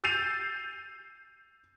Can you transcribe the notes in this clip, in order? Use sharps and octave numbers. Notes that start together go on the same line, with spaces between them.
E6 G6 A6 C7 D#7 F7